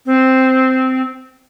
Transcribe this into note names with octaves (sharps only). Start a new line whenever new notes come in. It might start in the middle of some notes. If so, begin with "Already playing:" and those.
C4